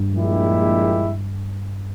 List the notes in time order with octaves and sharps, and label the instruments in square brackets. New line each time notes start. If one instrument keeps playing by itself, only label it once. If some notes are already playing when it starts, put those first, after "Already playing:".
Already playing: [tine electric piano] G2
[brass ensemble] A#1 A#2 G#3 E4 G4